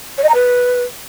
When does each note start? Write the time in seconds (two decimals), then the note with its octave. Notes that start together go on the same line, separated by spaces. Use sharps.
0.18 C#5
0.23 D#5
0.29 A#5
0.34 B4